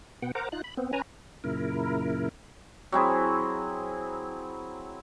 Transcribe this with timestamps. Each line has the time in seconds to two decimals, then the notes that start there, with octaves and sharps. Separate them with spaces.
0.22 B2 B3 F#5 G5
0.35 A#4 C5 F#5 A#5 D6
0.52 D#4 F4 F#6
0.64 B5
0.77 B3 C4
0.93 C#4 B4 G#5 A#5
1.44 F#2 A#2 C#3 E4 A#4
2.92 F#3 C4 E4 G#4